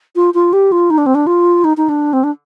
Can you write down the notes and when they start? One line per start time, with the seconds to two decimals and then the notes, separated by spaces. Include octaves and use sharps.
0.16 F4
0.34 F4
0.53 G4
0.72 F4
0.90 D#4
0.98 D4
1.06 C4
1.15 D4
1.27 F4
1.64 D#4
1.77 D#4
1.89 D4
2.13 C4
2.24 D4